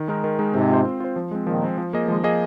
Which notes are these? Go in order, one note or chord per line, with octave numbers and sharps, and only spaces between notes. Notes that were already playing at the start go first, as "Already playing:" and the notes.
Already playing: D#3
G#3 D#4 A#4
D#3
G#3 D#4 A#4
G#2 C3 C4
F4 C5
C4
F4 C5
F3
G#3 C4
A#2 D#3 F3
G#3 C4
F3
A#3 G#4 D#5
D#3 F3 G#3
A#3 G#4 D#5